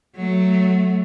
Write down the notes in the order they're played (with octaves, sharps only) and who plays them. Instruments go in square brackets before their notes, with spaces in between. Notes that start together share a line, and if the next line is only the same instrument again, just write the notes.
[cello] F#3 A3